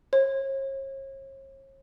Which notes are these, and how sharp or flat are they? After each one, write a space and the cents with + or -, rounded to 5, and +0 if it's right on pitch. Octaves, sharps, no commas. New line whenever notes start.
C#5 -45